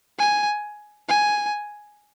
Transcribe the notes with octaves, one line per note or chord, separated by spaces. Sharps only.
G#5
G#5